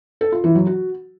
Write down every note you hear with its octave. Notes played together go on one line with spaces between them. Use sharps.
A4
F4
E3
F#3
F#4